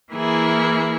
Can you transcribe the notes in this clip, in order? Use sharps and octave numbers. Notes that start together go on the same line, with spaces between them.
E3 A#3 E4 G#4